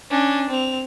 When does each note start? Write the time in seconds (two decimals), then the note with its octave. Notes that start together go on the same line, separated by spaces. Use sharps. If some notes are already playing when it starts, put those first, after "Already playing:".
0.10 C#4 D4
0.50 C4 F7